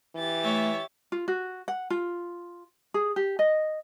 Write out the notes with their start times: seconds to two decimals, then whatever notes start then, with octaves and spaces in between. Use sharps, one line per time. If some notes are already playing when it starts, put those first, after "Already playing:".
0.15 E3 G4 A6
0.44 A3 C#5 E5
1.12 F4
1.28 F#4
1.68 F#5
1.90 F4
2.94 G#4
3.16 G4
3.39 D#5